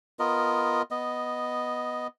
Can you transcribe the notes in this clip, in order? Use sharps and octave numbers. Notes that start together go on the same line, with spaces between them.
B3 F4 A#4 D#5
B3 D#5